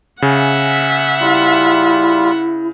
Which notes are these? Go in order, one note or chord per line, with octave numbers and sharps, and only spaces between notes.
C#3 E5 F#5 G#5
G3 E4 F4